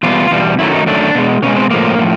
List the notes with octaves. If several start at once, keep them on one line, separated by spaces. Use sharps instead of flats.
E2 B2 G3 F4
E2 B2 G3
F#2 D#3 F#3 A3 E4
D#4
F#2 D#3 F#3 A3 D4
B2 G#3
B2 G#3 C#4
C4
A2 F3 G#3 A#3
A2 F3